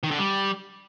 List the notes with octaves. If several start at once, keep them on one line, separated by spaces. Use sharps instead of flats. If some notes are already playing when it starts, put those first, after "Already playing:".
D#3
D3
G3